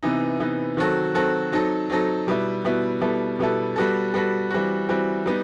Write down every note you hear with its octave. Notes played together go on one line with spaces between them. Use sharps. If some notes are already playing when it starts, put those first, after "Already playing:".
C3 E3 B3 D#4
C3 E3 B3 D#4
D#3 F#3 C4 F#4 A4
D#3 F#3 C4 F#4 A4
F#3 C4 D#4 A4
F#3 C4 D#4 A4
B2 G3 B3 E4
B2 G3 B3 E4
B2 G3 B3 E4 A4
B2 G3 B3 E4 A4
G3 B3 F#4 A4
G3 B3 F#4 A4
E3 G3 C4 F#4
E3 G3 C4 F#4
G3 B3 D#4